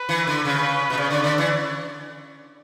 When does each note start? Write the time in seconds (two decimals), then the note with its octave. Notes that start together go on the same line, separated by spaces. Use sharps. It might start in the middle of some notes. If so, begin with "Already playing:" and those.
Already playing: B4
0.09 E3
0.27 D3
0.45 C#3 B4
0.90 B2
0.97 C#3 D5
1.10 D3
1.24 D3
1.38 E3